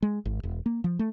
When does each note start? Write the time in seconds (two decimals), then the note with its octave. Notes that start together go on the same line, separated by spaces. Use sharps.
0.02 G#3
0.25 G#1
0.43 E1
0.66 A#3
0.84 F3
0.99 A3